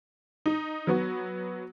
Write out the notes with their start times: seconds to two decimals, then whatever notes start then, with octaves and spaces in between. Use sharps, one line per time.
0.46 D#4
0.87 F#3 B3 F#4